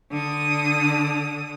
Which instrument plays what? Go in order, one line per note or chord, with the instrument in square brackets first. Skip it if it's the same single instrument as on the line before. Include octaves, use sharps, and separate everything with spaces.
[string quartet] D3 D#6